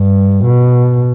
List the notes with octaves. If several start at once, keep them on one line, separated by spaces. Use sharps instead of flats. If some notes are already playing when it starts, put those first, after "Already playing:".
Already playing: G2
B2